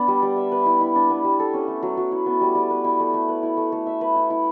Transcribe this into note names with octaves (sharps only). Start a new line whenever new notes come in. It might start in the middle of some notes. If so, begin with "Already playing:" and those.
Already playing: B3 D4
G3
G3
E5
B4
E4
E4
D4
B3
G3
A4
C#4
A3
F#3
F#3
E4
B3
G3
G3
B4
E4
A3
A3
B4
E4
A3
A3
E5
B4
E4
E4